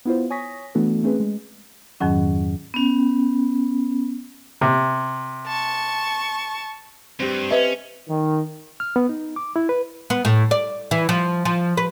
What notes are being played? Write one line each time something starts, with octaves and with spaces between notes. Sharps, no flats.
B3 E4 F4 C5
C#5 G#5 C#6 D#6 A#6 B6
E3 A3 B3 D4 F#4 A4
A3 C4 C#4 G#4 B4
G#3
F2 G#2 D#3 F#3 C#4
B3 C#4
C3
A5 C#6
G2 C4 G4
C#4 B4 D#5 E5
D#3
F6
B3
D#4
D6
E4
B4
B3
A2
D5
E3
F3
F3
B4